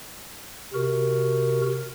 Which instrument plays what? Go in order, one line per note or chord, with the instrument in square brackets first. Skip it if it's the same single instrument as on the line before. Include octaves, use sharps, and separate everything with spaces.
[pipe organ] C3 F#4 A#4